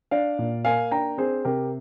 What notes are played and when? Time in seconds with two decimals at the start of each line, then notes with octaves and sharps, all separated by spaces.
0.11 D4 D5 F5
0.39 A#2
0.65 A#3 F5 G#5
0.91 D4 G5 A#5
1.18 C4 G#4 C5
1.45 C3 G4 A#4